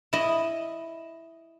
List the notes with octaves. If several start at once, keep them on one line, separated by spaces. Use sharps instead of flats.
E4 D#5